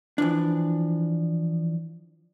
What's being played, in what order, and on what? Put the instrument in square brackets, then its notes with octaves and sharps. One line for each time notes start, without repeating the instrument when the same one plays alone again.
[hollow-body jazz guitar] E3 F3 D4